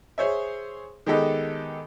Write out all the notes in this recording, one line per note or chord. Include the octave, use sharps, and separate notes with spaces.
G#4 C5 C#5 E5
D#3 G#3 B3 G4 A4 D#5